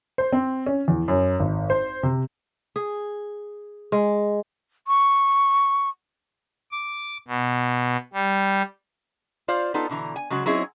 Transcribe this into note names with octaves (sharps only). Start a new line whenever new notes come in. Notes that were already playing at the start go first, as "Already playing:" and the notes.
C5
C4
C#4
E2
F#2
G#1
C5
C3
G#4
G#3
C#6
D6
B2
G3
F4 C5 D5 F5
B3 D#4 F4 A4
B2 D3 E3 A#5
G#5
C#3 F#3 G#3 F#4
F#3 C4 C#4 D#4 E4 G#4